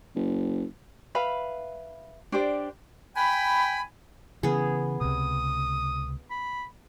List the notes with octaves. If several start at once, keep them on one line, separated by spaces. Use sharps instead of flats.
F#1
B4 E5 F5 B5
D4 G4 C5 D5
G5 G#5 B5
C#3 E3 B3 G#4
C#2 C3 D#6
B5